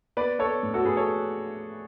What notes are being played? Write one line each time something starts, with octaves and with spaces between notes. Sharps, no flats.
B3 B4 D5
B3 A4 C#5
A2
F#4 A4
A2 G#4 B4
A4 C#5